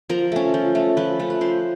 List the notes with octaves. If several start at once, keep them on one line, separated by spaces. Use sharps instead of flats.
F3 A#4
A3 C#4
F3
A3 C#4
F3 B4
A3 C#4
B4
F3 C5